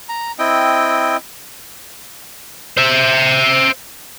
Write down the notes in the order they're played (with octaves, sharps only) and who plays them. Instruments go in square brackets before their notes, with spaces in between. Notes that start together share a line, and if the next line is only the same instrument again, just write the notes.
[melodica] A#5
C4 E4 D#5 G5
[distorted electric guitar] C5 E5